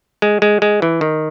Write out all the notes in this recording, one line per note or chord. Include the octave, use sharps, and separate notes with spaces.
G#3
G#3
G#3
E3
D#3